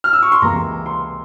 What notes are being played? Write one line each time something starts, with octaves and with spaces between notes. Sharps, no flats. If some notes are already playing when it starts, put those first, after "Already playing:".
F6
E6
C#6
C6
C#2 C3 E3 A#3 A#5
C6